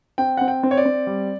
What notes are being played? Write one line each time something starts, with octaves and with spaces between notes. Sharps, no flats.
C4 G5
C4 F#5
G5
C4
C#5
D5
C4
G3